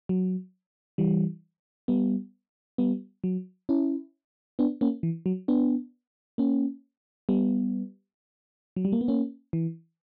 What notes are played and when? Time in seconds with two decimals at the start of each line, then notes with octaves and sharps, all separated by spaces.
0.09 F#3
0.98 E3 G3
1.88 G3 B3
2.78 G3 B3
3.24 F#3
3.69 C#4 E4
4.59 B3 D4
4.81 A#3 C#4
5.03 E3
5.26 F#3
5.48 B3 D4
6.38 A#3 C#4
7.29 G3 B3
8.76 F#3
8.85 G3
8.92 A#3
9.01 B3
9.08 A#3 C#4
9.53 E3